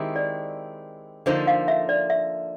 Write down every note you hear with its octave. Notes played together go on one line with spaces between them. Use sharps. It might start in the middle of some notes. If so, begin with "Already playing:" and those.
Already playing: D#3 G#3 C4 E4 G4
D5
D3 F3 A#3 D#4 C5
F5
E5
D5
E5